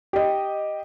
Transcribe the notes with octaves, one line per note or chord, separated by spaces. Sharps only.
G4 D#5